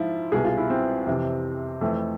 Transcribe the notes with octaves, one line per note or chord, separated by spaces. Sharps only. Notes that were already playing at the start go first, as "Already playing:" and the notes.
Already playing: G#2 F3 E4 F4
C2 B2 G#4
F4
E4
C4
F2 C3 E3
F2 E3 A3